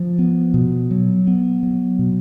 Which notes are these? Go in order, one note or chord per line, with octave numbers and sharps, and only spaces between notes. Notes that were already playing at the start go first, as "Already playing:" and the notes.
Already playing: F3
B3
B2
F#3
B3
F#3
B2